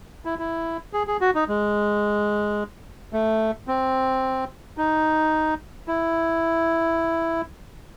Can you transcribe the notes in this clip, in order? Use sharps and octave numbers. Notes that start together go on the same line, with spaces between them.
E4
E4
G#4
G#4
F#4
D#4
G#3
A3
C4
D#4
E4